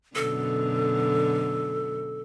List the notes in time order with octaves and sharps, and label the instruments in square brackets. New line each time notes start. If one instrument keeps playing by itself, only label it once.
[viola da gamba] F#2 B2 D3 [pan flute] A4